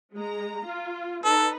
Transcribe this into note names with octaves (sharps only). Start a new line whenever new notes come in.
G#3 A#5
F4
D#4 A4 B4